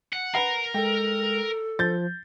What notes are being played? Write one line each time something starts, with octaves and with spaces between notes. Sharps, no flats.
F#5
A#4 B4 F#5 A#5 C7
G#3 A4 G5
F3 G6 A6